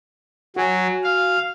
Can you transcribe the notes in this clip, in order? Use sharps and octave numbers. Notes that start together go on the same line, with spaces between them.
F#3 F#4 G#5
F5